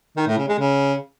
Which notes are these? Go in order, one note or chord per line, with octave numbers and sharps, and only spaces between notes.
D#3
A2
C#3
G#3
C#3